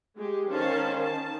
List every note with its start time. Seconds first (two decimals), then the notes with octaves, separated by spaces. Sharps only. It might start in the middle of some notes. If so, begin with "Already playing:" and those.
0.16 G#3 G4
0.50 D#3 C#4 C5 F5 A5
0.98 D#3 A5